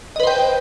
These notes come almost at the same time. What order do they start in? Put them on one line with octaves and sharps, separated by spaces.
D#5 B4 C5 G5